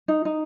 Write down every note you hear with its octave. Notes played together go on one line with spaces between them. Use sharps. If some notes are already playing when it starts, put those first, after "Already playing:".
D#4
D#4